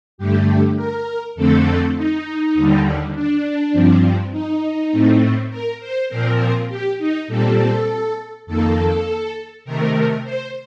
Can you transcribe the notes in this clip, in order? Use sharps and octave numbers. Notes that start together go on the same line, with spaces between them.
G2 D3 A3 G4
A#4
F2 D3 A3 C4 A4
D#4
D#2 D3 G3
D4
G2 F3 C4
D#4
A2 A3 C4
A#4
C5
A#2 F3 C4 A#4
G4
D#4
A#2 G3 C4 A4
F2 D#3 A#3 A4
C3 D#3 A3 A#4
C5